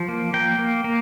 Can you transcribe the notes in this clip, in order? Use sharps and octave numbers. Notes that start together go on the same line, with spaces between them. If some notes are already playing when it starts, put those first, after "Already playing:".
Already playing: F3
A#3
A#3 G5
A#3
A#3